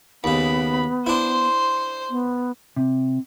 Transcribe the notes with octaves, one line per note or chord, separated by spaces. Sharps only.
D#2 C#3 B3 B5
D4 E4 C5 C6
B3
C3